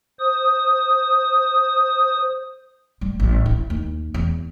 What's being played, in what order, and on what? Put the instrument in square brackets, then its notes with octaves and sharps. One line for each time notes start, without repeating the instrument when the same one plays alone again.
[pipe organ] C5 D#6
[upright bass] G3
A1
E4
D#2
E2